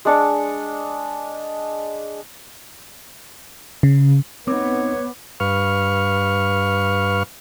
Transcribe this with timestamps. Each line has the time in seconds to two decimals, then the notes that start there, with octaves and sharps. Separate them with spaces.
0.05 G#3 D4 C#6
3.83 C#3
4.48 B3 C4 D#4 C#5 D6
5.40 G2 B4 F5 C#6 F6